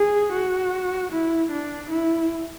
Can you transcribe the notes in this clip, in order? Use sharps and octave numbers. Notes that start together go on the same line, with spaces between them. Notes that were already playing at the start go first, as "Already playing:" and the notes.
Already playing: G#4
F#4
E4
D4
E4